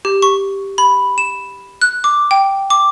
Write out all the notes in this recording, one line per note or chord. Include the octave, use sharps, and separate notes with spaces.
G4
C#6
B5
E7
F#6
D6
G5
D6